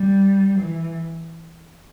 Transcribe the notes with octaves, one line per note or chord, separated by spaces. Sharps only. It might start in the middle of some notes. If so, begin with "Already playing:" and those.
Already playing: G3
E3